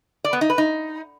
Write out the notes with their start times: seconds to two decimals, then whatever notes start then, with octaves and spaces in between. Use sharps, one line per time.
0.24 D5
0.33 B3
0.41 D#4
0.50 B4
0.58 D#4